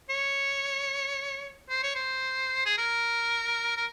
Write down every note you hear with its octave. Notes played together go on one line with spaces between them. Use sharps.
C#5
C5
C#5
C5
G#4
A#4
A#4